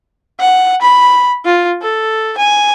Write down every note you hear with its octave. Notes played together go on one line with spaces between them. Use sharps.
F#5
B5
F4
A4
G#5